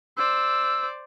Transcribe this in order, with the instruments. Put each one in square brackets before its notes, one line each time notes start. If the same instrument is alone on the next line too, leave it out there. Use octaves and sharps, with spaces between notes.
[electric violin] C5 D5 [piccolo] E6